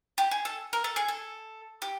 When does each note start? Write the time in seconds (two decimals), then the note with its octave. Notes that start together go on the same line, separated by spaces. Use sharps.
0.18 G4
0.31 G#4
0.45 A4
0.73 A#4
0.84 A4
0.96 G#4
1.08 A4
1.82 G4